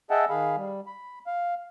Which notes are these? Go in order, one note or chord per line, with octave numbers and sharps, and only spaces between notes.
G#4 D#5 E5 F#5 G5 A5
D#3 G#4 F5 B5
G3
B5
F5